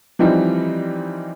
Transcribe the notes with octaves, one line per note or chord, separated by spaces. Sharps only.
E3 F3 G3 C4 D#4